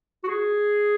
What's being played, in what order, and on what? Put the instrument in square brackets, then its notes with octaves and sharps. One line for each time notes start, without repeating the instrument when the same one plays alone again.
[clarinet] F#4
G#4